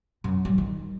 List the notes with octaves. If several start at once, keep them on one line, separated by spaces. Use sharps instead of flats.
F#2
A1 G3
D#3